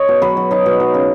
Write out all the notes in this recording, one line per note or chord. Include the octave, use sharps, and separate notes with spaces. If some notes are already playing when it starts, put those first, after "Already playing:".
Already playing: C#5 D#5
B2
F#3 B4
F#3
F#3 D#4
B2
F#3
C#3